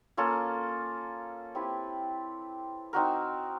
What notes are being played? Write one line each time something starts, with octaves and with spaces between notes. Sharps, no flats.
A#3 C#4 F4 A4
C4 E4 G4 B4
C4 D#4 F#4 A#4